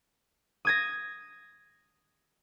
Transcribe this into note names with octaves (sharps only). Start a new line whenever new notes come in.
D#6 G#6 A#6